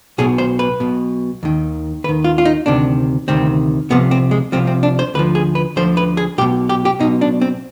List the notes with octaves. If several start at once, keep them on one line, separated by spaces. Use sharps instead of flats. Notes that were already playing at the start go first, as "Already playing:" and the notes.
B1 B2 G#4
C5
B4
B1 B2
D#2 D#3
D#2 D#3 B4
F4
F4
D#4
D2 C3 D#3 D4
D2 C3 D#3 C4
C2 C3 F3 B3
C4
G#3
C2 C3 F3 C4
C4
D4
C5
D2 D3 F3 B4
G#4
B4
D2 D3 F3 C5
B4
G#4
B1 B2 G4
G4
G4
B1 B2 D#4
D4
C4